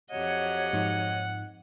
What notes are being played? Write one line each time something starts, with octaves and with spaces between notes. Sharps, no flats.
F2 F#3 G4 C#5 D#5 F#5
G#2 F3 D#4